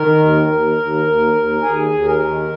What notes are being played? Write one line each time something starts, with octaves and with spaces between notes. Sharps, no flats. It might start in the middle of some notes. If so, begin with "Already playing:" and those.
Already playing: D#3 A#4
D#2
D#2
D#2
D#2
D#2
D#2 G#4
D#2
A#4
D#3